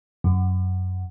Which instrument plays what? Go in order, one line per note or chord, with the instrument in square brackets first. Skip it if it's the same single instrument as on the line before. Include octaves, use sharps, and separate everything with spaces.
[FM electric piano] F#2